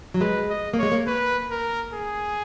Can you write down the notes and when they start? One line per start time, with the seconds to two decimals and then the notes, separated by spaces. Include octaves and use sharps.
0.14 F#3
0.21 G#3 B4
0.50 D#5
0.74 A#3
0.79 G#3 C#5
0.92 A#3
1.07 A#3 B4
1.51 A#4
1.94 G#4